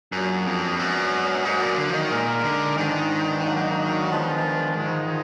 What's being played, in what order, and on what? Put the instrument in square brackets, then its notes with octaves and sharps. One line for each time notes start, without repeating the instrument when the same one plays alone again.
[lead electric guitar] F#2 [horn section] F#3 A#3 D4 F4 G#4
[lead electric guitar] F2
[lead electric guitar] F#2 [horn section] G#3 B3 D4 F#4
[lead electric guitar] G#2 [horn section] F#3 A#3 D4 F#4
[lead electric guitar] A#2
D3
F3
D#3
[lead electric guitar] A#2 [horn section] G#3 D#4 A#4
[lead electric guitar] D3
[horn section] G#2 F3 B3 D4 [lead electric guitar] D#3
[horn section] G#2 F#3 A#3 D4 F#4
F3 G#3 B3 D4 F4
G#2 F3 G#3